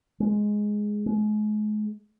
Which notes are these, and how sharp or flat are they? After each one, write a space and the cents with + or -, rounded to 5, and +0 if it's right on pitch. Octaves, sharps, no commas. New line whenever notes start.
G#3 +5
G#3 +35